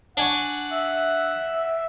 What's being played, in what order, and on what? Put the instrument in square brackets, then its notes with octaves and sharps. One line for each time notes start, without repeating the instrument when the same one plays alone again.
[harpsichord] D4 G#5 C#6 [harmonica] F#5
[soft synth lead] E5